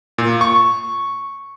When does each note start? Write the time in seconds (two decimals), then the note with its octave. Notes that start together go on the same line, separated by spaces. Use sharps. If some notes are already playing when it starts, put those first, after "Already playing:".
0.18 A#2
0.41 C#6